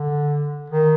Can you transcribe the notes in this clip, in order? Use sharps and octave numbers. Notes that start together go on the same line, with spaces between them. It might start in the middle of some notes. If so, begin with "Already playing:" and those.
Already playing: D3
D#3